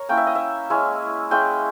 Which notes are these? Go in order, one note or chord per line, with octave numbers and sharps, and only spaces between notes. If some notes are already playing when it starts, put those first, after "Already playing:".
Already playing: A#4 C#5
A#3 C#4 E4 G5
E5
D#5
E5
G#3 C#4 E4
G#3 C#4 E4 G5